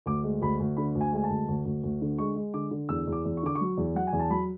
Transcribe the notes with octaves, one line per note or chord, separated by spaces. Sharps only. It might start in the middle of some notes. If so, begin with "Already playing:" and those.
D2 D6
G#3
D2 B5
D2
D3 B5
D2
G#5
G#3 G#5
A5
D2
D2
D2
D2
D3
G#3 C#6
G#3
D3 D6
D3
E2 E6
E2
D6
E2
C#6
D3 D6
C#6
F#3
E2
F#3 F#5
G#5
E2
A5
F#3 B5